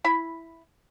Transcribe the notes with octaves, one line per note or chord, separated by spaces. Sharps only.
E4 B5